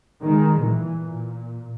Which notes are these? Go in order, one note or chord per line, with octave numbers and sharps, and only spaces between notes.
D#3 G#3
A#2 E3
A#2